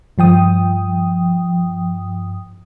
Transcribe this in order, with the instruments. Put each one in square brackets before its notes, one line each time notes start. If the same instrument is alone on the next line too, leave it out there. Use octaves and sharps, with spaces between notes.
[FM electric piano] G2 F3 G5 D#6